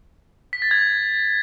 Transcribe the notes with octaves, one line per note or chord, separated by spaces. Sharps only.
B6
A6
G#6